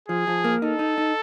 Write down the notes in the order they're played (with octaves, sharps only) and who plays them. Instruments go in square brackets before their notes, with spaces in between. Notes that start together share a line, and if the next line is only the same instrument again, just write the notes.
[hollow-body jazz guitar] F3 [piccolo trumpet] G#4
[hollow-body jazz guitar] F3
A#3
[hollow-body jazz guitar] D#4 [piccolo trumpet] A4
[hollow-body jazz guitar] D#4
D#4